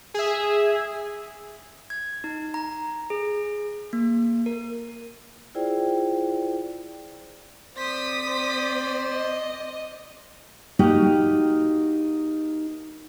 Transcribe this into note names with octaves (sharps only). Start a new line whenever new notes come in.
G#4 E5
G#6
D#4
A#5
G#4
A#3
A#4
E4 F4 G#4 C5 D5 G5
C4 C5 D5 D#6 B6
C5
D#5
A#3 D#4 F#4 G4